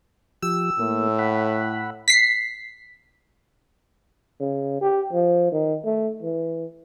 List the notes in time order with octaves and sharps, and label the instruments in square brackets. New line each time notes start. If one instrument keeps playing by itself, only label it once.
[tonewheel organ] F3 G4 [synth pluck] E6
[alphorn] A2 [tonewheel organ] A#3
[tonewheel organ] F#5 B5
[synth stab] B6 C7
[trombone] C#3
G4
F3
D#3
A3
E3